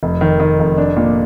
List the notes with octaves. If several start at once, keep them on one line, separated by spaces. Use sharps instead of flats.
F1
D#3
D#3
F1
D4
A#2